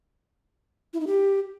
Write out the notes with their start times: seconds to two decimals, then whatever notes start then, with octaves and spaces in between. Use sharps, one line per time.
0.94 E4
1.00 D#4
1.07 G4